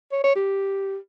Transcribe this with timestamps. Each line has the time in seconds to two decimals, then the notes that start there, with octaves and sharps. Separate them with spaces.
0.12 C#5
0.24 C#5
0.36 G4